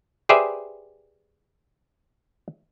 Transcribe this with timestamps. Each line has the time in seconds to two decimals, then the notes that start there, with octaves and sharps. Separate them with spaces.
0.29 G4 G#4 B4 C5 D5 E5